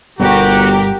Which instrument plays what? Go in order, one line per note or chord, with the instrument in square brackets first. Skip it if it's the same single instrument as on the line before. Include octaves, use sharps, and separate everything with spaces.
[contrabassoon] G1 [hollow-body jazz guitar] G2 B2 G3 [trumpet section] F#4 [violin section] G4 A#4